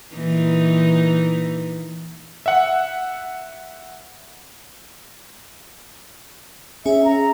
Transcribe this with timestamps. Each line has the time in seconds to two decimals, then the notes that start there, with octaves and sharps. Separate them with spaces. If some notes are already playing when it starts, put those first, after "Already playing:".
0.15 A#2 E3 D#4
2.46 E5 F#5
6.86 C#4 G#4 E5
7.04 A#5